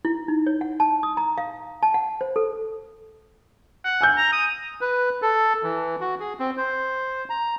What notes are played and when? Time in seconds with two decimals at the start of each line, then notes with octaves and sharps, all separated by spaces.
0.05 E4
0.28 D#4
0.47 C#5
0.61 F#5
0.80 A5
1.03 D#6
1.17 A#5
1.38 F5
1.83 A5
1.94 F#5
2.21 C5
2.36 A4
3.84 F#5
4.01 G#5 E6 G6
4.17 A#5
4.32 D#6
4.81 B4
5.22 A4
5.63 E3
6.01 F#4
6.20 G#4
6.39 C4
6.57 C5
7.30 A#5